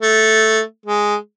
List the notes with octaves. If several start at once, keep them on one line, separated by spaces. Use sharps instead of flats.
A3
G#3